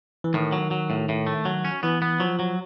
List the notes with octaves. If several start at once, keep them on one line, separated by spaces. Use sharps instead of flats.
E3
A2 D#3
F#3
F#3
A2
A2
A3
F#3
C#4
E3 B3
B3
F3 F#3
F#3